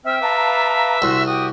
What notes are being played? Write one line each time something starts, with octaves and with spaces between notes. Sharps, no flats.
C4 E5 G5 F6
B4 F5 A5 A#5 D6
C2 F#4 C6 E6
F#4 G4 D#6